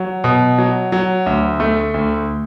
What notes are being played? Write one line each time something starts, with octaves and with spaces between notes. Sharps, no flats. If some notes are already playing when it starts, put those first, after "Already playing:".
Already playing: F#3
B2
F#3
F#3
D2
A3
D2